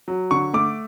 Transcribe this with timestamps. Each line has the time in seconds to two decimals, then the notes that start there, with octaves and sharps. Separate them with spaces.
0.08 F#3
0.31 D3 C#6
0.54 A3 D6